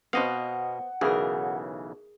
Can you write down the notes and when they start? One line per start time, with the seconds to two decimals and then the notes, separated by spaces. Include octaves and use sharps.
0.13 B2 B3 C4 D#5 F5 F#5
1.01 B1 C#3 E3 G#4 A#4